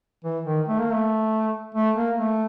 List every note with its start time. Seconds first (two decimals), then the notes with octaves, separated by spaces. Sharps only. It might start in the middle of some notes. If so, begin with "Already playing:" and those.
0.24 E3
0.45 D#3
0.68 A3
0.80 A#3
0.93 A3
1.75 A3
1.96 A#3
2.18 A3